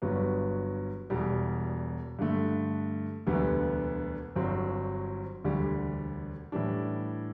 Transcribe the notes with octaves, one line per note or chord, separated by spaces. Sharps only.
G1 G2 F#3 B3
E1 E2 B2 G3
G2 D3 A3
E1 D2 D3 G3 B3
G1 G2 F#3 C4
E1 D2 D3 G3
A2 E3 G3 D4